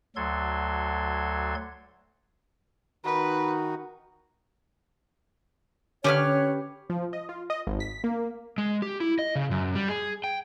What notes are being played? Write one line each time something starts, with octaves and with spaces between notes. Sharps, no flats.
D2 F#3 A4 C6 G#6
D#3 D#4 F#4 B4
D3 C#4 G4 B4 C#5 F6
F3
D#5
F4
D#5
G#1
B6
A#3
G#3
G4
E4
D#5
C#3
F#2
G3
G#4
G5